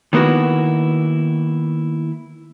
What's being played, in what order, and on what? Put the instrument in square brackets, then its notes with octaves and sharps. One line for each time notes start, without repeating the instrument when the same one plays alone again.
[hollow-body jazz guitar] D#3 A#3 B3 E4 F#4